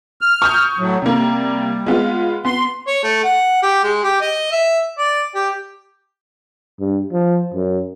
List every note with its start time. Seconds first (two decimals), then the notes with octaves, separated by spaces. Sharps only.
0.21 F6
0.42 C#6 D#6 G6
0.78 A2 F#3
1.02 C3 G3 A#3
1.86 G#3 B3 F4
2.45 B3 C6
2.87 C#5
3.03 A3
3.24 F#5
3.62 G4
3.83 G#3
4.03 G4
4.21 D#5
4.52 E5
4.98 D5
5.35 G4
6.80 G2
7.12 F3
7.54 F#2